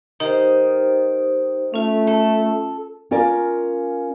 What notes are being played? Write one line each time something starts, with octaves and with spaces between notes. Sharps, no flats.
D#3 D#4 G4 C5
A3 C#4 F4
A4
C#4 F4 A#4 D5